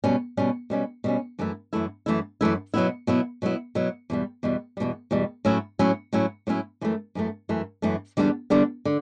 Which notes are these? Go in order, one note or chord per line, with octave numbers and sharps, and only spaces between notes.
B2 G3 C#4
B2 G3 C#4
B2 G3 C#4
B2 G3 C#4
F#2 E3 A3 E4
F#2 E3 A3 E4
F#2 E3 A3 E4
F#2 E3 A3 E4
B2 F#3 B3 E4
B2 F#3 B3 E4
B2 F#3 B3 E4
B2 F#3 B3 E4
E2 B2 G3
E2 B2 G3
E2 B2 G3
E2 B2 G3
A2 F#3 C#4 E4
A2 F#3 C#4 E4
A2 F#3 C#4 E4
A2 F#3 C#4 E4
F#2 E3 A3
F#2 E3 A3
F#2 E3 A3
F#2 E3 A3
E2 D3 G3 B3 D4
E2 D3 G3 B3 D4
D3